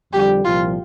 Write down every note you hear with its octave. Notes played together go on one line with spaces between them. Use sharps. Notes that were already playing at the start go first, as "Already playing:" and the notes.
F2 D3 G3 G4
C2 A#2 F3 F4